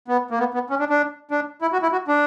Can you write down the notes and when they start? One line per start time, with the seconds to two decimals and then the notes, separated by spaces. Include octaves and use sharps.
0.08 B3
0.31 A#3
0.39 B3
0.54 B3
0.70 C#4
0.80 D4
0.90 D4
1.31 D4
1.62 E4
1.73 F#4
1.83 E4
1.92 F#4
2.08 D4